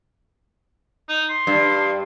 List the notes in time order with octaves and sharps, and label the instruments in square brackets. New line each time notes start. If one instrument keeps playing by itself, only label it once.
[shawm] D#4
C6
[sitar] G2